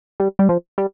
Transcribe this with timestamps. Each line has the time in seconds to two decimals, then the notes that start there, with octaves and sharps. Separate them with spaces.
0.20 G3
0.39 G3
0.49 F3
0.78 G3